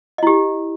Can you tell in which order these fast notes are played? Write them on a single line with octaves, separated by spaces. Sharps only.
D#5 E4 G4